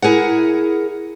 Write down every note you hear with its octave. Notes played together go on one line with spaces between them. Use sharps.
E4 G#4 A#4 F#5